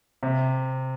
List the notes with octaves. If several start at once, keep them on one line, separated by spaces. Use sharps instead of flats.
C3